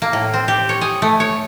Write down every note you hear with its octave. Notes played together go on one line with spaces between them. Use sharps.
A#3
A2
C4
G4
C#5
G#4
A3
C#5